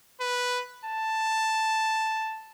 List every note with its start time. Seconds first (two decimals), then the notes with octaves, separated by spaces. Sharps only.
0.20 B4
0.85 A5